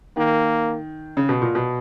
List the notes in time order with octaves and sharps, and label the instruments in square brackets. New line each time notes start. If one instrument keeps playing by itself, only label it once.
[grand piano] D#3 [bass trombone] A#3
[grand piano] C#3
B2
A#2
B2